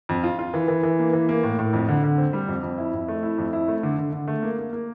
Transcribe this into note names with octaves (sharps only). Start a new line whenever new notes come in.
F2
F4
F4
E3
E3
E3
A#3
E3
A#3
A2
A2
F2
D3
D3
C4
G3
F2
F2
E4
F2
A3
E4
F2
E4
A3
D3
D3
D3
A3
A#3
A#3
A#3